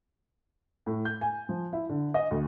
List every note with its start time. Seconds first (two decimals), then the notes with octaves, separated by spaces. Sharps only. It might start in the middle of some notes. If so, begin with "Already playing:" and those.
0.86 A2
1.05 G6
1.21 G#5
1.49 F3
1.73 E4
1.89 D3
2.14 D#5
2.31 D2